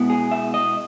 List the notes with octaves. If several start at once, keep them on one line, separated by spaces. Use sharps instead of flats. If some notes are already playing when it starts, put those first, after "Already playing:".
Already playing: B2 G#3 B3 E4
G#4
E5
D#5